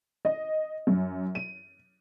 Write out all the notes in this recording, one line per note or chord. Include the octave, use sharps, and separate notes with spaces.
D#5
F#2
D#7